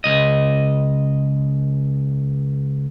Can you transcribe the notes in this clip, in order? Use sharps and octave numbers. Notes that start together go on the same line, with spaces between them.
C#2 D#5